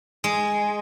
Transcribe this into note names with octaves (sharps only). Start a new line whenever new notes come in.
G#3